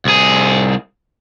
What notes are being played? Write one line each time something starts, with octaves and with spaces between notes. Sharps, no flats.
C2 G#4